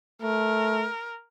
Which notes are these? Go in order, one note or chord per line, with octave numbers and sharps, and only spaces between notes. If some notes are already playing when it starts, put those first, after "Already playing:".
A3 A#4